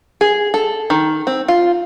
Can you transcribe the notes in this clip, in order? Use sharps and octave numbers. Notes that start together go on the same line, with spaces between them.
G#4
A4
D#3
C4
F4